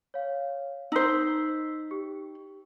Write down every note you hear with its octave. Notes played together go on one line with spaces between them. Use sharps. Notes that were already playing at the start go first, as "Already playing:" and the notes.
C#5 F5
D#4 C5 E6 B6
G4